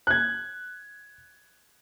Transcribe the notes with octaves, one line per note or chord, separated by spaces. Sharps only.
F#6 G#6